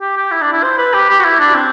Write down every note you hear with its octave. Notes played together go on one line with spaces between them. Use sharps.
G4
G4
E4
D4
E4
C5
B4
G4
G4
F#4
E4
D4
C4